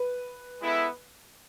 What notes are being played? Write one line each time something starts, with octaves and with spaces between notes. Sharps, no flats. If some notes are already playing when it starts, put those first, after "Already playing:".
Already playing: B4
G#3 B3 E4 A4 E5